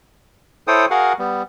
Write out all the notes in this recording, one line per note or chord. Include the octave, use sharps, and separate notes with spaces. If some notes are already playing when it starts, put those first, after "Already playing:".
E4 A4 C5 C#5 G5 D#6
F#4 G#4 A#4 F5 F#5
G3 B3